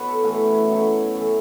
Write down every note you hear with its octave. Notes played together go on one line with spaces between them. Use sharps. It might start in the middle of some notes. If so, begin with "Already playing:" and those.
Already playing: B2 B4 C#5
A4
A2 E3 A3 F#4
E4
C#4
E4
B2 F#3 A3
F#2 E3 A3